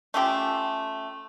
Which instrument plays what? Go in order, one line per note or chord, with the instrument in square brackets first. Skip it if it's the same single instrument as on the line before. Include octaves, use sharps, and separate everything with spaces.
[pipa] A3 C#4 F4 G4